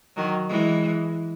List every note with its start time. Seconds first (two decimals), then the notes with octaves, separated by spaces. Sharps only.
0.16 D#3 F#3
0.49 E3 G#3